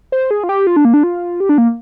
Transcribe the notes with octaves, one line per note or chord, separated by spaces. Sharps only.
C5
G#4
F4
G4
F4
D4
A#3
D4
F4
G4
D4
A#3